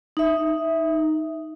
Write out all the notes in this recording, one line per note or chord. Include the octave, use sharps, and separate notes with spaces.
D#4 E5